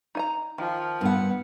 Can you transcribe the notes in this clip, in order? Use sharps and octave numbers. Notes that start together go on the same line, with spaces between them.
D#4 G#5 A#5
D#3 F3
G2 B3 F#5